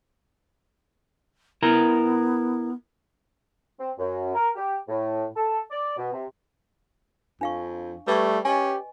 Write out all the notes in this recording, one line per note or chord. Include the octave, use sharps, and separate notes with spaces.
B3 E4 A#4 A#5
C4
F#2
A#4
G4
A2
A4
D5
B2
C3
F2 D4 F5 C#6
G3 A3 B4 D5 C#6
C#4 G4 D#5 G#5